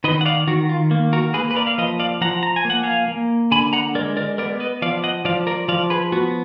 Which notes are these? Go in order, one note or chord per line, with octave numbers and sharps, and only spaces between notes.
D#3 B4 D#5
F#5
D5 F5
D#3 F#4
F4
A#3
F#4 A#4
A#3 G#4 B4
B4
A#4 D5
F5
F3 B4 D#5
D5 F5
F3 F#5 A#5
A#5
G#5
A#3 F#5
F5 G#5
A#3
D3 G#5 B5
F#5 A#5
G#3 A#4 D5
A#4 D5
B3 A#4 D5
B4 D#5
F3 D5 F5
D#5 F#5
F3 D5 F5
A#4 D5
F3 D5 F5
G#4 B4
B3 F#4